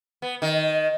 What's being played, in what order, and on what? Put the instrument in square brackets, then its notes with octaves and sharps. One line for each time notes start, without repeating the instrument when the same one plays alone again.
[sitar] B3
D#3